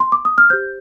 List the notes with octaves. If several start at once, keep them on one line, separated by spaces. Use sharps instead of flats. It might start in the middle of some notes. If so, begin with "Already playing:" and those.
C6
D6
D#6
F6
G4 C5 G6